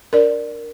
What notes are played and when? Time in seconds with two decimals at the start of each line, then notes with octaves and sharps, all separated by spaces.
0.13 D4 A#4 D5